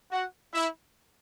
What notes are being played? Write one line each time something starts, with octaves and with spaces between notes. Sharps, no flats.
F#4 F#5
E4 E5